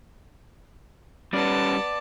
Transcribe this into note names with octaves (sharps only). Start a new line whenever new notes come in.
G3 B3 C#4 D5 A5